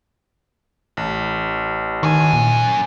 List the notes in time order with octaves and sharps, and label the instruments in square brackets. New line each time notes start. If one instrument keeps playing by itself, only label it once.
[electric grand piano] A1
[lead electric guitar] F#2 G#5 [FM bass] D#3
[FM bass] A#2